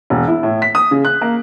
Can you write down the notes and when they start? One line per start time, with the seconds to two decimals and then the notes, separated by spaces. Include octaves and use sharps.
0.10 E1
0.28 E4
0.43 A2
0.62 B6
0.75 D#6
0.91 C#3
1.05 F#6
1.21 A#3